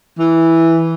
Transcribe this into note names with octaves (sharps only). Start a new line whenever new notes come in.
E3